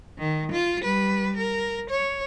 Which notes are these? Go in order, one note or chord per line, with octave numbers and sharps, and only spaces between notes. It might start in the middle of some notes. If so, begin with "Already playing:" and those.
D#3
F4
G3 B4
A#4
C#5